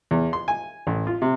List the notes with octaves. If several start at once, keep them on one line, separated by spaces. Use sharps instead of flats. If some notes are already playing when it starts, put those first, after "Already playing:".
E2
C6
G#5
A1
F4
C3